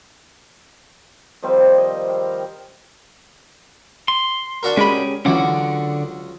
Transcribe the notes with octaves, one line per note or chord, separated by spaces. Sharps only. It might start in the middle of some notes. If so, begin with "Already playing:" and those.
D#3 F3 G3 C4
D#5
F5
C6
D4 F#4 A#4
G#3 C#4 G4 G#4 B5
C#2 D3 E3 F#3 C#4 F#5 D6